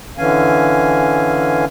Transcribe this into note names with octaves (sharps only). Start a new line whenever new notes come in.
D3 E3 C#4 F5 G#5